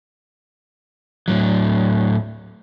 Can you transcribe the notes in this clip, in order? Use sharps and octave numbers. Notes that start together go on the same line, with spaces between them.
A2 F#3